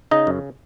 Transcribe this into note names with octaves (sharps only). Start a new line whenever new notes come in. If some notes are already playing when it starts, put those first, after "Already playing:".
C#3 D#4 D#5
F#2